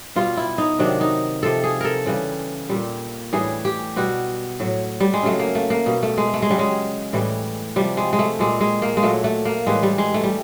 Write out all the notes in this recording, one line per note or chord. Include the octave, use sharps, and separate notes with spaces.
B2 G3 F4
E4
D#4
C3 D#3 F#3 D4
D#4
C3 F3 A4
G#4
A4 A#4
C#3 E3 G3
A#2 G3
A2 E3 G3 G#4
G4
B2 G3 F#4
A2 F#3
G3
G#3
C#3 F#3 A3
A#3
A3
A#3
B2 G3
A3
G#3
A3
G#3
C#3 F#3 G3
G#3
A2 E3 G3
C3 F3 G3
G#3
G#3
A3
A#2 G3 G#3
G#3
A#3
G#3
A#2 F#3 A3
A3
A#3
A2 E3 G3 G#3
G3
G#3
A3
G3